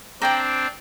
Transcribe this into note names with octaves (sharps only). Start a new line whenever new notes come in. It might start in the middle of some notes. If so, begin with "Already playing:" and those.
C4 D4 D5 G5 A#5